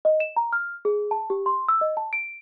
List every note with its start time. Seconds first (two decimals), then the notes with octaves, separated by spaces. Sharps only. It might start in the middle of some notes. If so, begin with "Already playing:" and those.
0.05 D#5
0.20 E7
0.36 A#5
0.53 F6
0.85 G#4
1.11 A5
1.30 G4
1.46 C6
1.68 E6
1.81 D#5
1.97 A5
2.13 D7